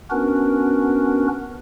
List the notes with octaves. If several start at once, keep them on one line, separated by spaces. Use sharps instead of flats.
B3 C#4 D4 F#4 A#4 B4